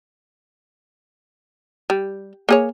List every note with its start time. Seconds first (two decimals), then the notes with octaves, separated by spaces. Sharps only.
1.90 G3
2.49 A#3 G#4 C#5